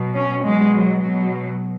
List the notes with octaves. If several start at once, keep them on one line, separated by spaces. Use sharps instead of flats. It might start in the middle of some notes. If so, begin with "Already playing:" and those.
Already playing: B2 F#3
C#4
B2 F#3 G#3
F#3
B2 F#3